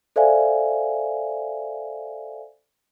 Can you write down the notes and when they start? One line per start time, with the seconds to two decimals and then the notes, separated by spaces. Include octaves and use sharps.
0.16 A4 C5 D5 E5 F5 G#5